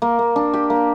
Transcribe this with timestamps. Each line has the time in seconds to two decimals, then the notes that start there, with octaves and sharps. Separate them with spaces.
0.02 A#3
0.19 A#3
0.36 D4
0.54 G4
0.70 A#3